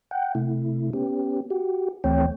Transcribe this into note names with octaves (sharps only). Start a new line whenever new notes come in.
F#5 G5
C3 A3 E4
B3 C#4 G4
F#4 G4
D2 E3 A3 C4 C#5 G5